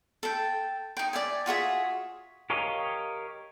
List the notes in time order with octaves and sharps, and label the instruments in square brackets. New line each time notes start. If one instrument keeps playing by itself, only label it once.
[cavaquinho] A4 G5
D#4 G5
D5 E5 G#5
F4 F#4 G#4 E5
[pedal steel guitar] G4 A#4 C#5 D#5 F5